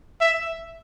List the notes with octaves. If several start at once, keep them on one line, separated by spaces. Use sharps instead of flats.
E5